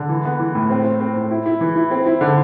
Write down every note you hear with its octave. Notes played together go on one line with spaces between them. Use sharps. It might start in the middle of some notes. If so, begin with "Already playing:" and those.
Already playing: D3
E3
B3
E3
A2
C4
C4
C4
A2
E4
E4
E3
E4
C4
E4
D3